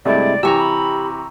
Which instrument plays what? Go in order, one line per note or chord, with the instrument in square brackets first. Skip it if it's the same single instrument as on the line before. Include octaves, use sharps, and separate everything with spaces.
[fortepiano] G2 A3 [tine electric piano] C3 G#3 E4 [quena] D5
[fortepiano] C3 E3 [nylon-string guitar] G4 G#5 [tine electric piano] A#5 C#6 E6
[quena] B5